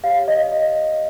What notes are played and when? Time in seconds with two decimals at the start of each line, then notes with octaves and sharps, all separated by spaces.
0.04 G4 C#5 F5
0.28 D#5
0.52 D#5